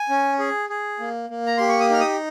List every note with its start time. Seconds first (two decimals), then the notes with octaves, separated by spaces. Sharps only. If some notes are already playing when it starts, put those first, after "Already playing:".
Already playing: G#5
0.09 C#4
0.39 G#4
0.69 G#4
1.00 A#3
1.30 A#3
1.46 A#5
1.58 G4 C6
1.68 C#6
1.80 D#6
1.90 D#4 F6
2.00 D#6